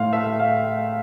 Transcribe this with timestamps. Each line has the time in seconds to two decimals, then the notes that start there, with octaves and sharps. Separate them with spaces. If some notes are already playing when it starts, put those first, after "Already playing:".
Already playing: A2 A3 F5 C6
0.12 A3 E5
0.39 F5